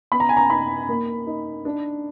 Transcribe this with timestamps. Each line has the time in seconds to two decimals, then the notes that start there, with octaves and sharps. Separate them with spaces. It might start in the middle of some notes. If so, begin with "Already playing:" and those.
0.12 B3 B5
0.20 A#5
0.29 G#5
0.37 A#5
0.50 D#4 B5
0.89 A#3
1.27 D#4
1.65 D4